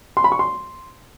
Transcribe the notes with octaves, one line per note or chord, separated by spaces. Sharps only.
C6
B5
C#6
C6